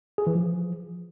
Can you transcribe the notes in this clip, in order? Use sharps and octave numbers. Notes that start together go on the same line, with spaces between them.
G#4
E3
F3